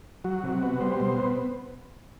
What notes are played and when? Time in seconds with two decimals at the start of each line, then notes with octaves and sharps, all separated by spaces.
0.24 F#3 F#4
0.43 C3
0.62 B3
0.80 G3 C5
1.00 B2
1.18 B3